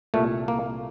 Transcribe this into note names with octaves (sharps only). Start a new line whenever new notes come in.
C2 A#2 A3
A#3